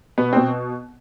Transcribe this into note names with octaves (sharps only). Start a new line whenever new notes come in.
B2 B3
B2 C4